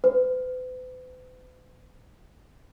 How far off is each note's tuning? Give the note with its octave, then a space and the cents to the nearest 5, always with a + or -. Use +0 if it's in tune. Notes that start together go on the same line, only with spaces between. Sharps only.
B4 +45